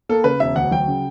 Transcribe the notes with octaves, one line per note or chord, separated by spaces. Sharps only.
A#3 A4
C#3 B4
E1 E5
D2 F#5
F#3 G5
C#3